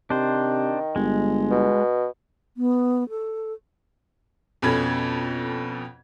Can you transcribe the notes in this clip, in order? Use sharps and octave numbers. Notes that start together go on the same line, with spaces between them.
C3 D#3 D4 C5
G1 G#3
B2
B3
A4
F2 B2 C#4 A4 B5 G#6